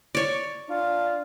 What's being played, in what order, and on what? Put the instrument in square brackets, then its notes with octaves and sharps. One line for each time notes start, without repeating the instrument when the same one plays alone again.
[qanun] C#5 D5
[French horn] D4 [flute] F4